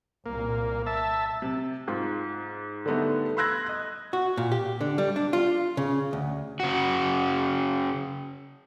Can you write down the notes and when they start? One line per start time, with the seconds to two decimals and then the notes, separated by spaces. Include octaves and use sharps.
0.26 C2 A#2 A#3
0.87 E5 A5
1.42 C3
1.88 G#2 F4
2.86 D3 G3 A3 B3 D#4
3.37 B5 C6 E6 F#6 G#6 A#6
3.66 D#5 F#6
4.13 F#4
4.37 A#2
4.52 G4
4.81 D3
4.98 G3
5.16 D4
5.33 F4
5.77 C#3
6.13 D2
6.60 C#3 F#4